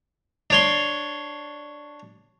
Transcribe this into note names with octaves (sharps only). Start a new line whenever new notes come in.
D4 C#5 C6